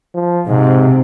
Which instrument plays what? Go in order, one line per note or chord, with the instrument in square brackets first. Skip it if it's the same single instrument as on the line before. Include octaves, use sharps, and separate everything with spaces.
[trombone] F3
[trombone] G#2 [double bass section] C3